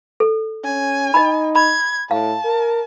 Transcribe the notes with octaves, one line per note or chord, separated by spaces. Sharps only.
A4
C#4 G#5
D#4 D#5 B5
B5 G#6
A2 F5 A5
A#4